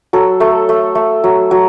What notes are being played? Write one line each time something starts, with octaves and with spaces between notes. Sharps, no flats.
F#3 A4
A3 A4
A3
A3
F#3
F#3